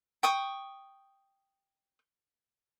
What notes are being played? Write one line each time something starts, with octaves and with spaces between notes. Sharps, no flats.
G5 C#6 D#6